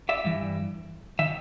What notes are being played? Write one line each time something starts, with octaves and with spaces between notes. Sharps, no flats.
D5 E5
G2 E3
D#3 E5